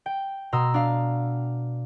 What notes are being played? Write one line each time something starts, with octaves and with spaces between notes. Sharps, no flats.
G5
B2 A#5 C6 D#6 E6
D4 F5